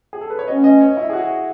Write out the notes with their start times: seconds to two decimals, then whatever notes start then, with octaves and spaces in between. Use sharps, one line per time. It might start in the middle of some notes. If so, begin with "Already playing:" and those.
0.13 G#4
0.21 A4
0.30 B4
0.39 C#5
0.48 B2 A3 C#4 D#5
0.64 D#5
0.81 C#5
0.97 E4
1.10 G#4
1.13 F#4